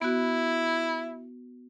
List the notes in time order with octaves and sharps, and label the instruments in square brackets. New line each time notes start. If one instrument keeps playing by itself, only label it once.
[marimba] B3 F#4 [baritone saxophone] E4